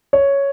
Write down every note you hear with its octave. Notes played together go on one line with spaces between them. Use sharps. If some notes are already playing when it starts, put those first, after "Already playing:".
C#5